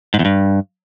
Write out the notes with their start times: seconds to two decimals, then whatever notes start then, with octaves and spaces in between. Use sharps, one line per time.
0.14 G#2
0.19 E2
0.25 G2